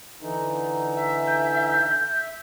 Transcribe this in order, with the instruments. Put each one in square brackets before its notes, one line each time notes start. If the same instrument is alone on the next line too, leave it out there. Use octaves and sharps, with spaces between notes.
[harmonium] D3 E3 D#4
[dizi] E5
[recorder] G6
[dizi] E5